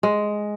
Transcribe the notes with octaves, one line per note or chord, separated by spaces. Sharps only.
G#3